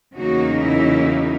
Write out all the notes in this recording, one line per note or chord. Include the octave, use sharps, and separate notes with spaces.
E2 C#3 F#3 A#3 D#4 F#4
E4